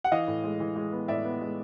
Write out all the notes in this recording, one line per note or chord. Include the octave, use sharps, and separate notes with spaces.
F#5
E3 D#5 F5
A2
G#3
E3
G#3
B3
A2 D5 E5
B3
G#3